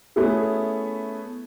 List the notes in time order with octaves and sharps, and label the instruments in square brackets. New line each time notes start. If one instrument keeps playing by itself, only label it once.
[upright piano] A3 B3 C#4 E4 G#4